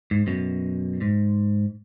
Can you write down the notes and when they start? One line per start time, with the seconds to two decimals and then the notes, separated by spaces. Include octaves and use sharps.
0.11 G#2
0.27 F#2 B2
1.01 G#2